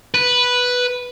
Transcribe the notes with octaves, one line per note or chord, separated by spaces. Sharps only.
B4